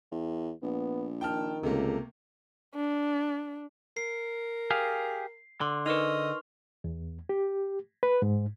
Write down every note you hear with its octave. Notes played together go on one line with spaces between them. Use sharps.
E2
A#1 B3
D#3 G5 A5 F6
C#2 C3 A3 A#3
D4
A#4 C7
G4 G#4 F5
D3 C6 D6
D#4 A#4 B4 D#5 C#6 F6 F7
E2
G4
B4
G#2